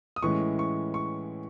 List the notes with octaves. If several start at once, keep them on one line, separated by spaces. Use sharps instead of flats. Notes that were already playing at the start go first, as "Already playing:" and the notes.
D#6
A2 E3 G#3 C#4 C#6
C#6
C#6